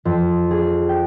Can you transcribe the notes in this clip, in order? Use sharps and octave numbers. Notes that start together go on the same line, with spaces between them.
F2
G#4
G5